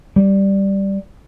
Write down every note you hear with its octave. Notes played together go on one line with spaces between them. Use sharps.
G3